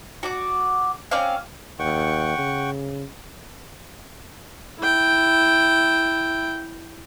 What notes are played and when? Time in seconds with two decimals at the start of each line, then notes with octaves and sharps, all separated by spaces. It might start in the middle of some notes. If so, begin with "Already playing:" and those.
0.23 F#4 D5 D6
1.11 C4 C#4 D5 F5
1.79 D#2 F#5 G5 C#6
2.38 C#3
4.79 E4 G5